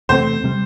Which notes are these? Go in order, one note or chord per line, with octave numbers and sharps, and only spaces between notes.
E2 C3 A3 C4 C5
C3 G3